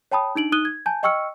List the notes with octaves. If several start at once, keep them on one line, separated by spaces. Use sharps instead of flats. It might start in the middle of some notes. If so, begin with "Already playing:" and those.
C#5 G5 A5 B5 D#6
D4 D#4 D7 F#7
D#4 D#6 F#6 D#7 G7
G#6
G#5 A5 G6
D#5 G5 C#6 E6 F6 C#7